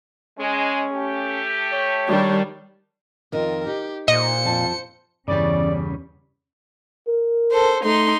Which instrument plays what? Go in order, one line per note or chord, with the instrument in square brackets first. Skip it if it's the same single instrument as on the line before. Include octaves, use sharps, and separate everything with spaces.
[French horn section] G#3 [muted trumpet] C#4
[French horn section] A3 G4
[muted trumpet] C#5
[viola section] D#3 G3 D4
[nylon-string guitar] F2 D#3 [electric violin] F4 A#4
[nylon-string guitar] D#4 [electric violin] G4
[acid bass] A#2 [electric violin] C5 C#7 [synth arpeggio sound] D#5
[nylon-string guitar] F2 A5
[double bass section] E2 C#4 [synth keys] G2 E3 G4 [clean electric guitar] C#3 G3 [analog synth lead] D5
[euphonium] A#4
[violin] A4 C5
[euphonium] A3 [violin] D#4 C6